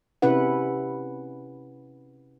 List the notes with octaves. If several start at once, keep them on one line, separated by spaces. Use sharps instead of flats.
C3 C#4 E4 B4 F#5